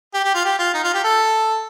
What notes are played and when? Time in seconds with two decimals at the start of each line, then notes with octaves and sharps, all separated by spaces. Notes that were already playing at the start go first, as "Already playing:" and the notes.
0.14 G4
0.24 G4
0.34 F4
0.44 G4
0.59 F4
0.74 D#4
0.84 F4
0.94 G4
1.04 A4